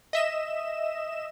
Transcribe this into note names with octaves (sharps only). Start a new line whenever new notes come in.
D#5 E5 E7